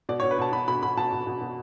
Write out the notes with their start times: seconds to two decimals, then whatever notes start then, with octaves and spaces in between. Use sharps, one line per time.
0.09 B2 D5
0.20 C#5
0.23 B2
0.31 B4
0.38 B2 A5
0.52 B2 B5
0.68 B2 B5
0.83 B2 B5
0.97 B2 A5
1.12 B2
1.27 B2
1.41 B2